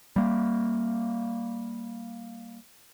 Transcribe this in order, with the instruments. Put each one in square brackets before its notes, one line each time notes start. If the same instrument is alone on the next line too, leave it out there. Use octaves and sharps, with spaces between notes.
[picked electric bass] G3 A#3